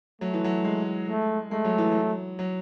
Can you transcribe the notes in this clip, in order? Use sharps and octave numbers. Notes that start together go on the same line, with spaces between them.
F#3 A3
E3
F#3
G#3
A3
G#3 A3
F#3
E3
F#3
F#3